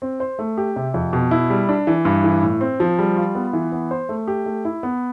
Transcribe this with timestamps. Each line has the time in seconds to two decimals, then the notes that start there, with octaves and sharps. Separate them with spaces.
0.02 C4
0.20 C5
0.39 A3
0.57 G4
0.76 C3
0.94 F2
1.13 B2
1.31 E4
1.50 G3
1.69 D4
1.87 E3
2.05 G2
2.24 E3
2.43 A2
2.61 C4
2.80 F3
2.99 G3
3.16 F4
3.35 B3
3.53 E3
3.73 B3
3.91 C5
4.09 A3
4.28 G4
4.46 A3
4.65 E4
4.83 B3